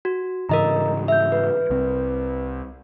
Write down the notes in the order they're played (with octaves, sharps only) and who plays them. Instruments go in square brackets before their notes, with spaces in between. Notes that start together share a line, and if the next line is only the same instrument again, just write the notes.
[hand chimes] F#4
[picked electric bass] G#2 C#3 E3 [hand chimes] A#4 D#5 A#5
[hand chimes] E5 G6
B4
[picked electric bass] C2 C4